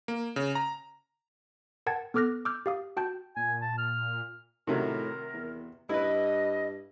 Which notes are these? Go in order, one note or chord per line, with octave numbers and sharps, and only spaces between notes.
A#3
C#3
A#5
A#4 F#5 G5 A5 G#6 A6
B3 A4 D6 F6 F#6 A#6
D6 E6 F6 G6
G4 F5 D#6
F#4 G5 A5 G6
A#2 G#5
A5
F6
A2 C3 D#3 F#3 A#4
E2
G2 E4 B4 D#5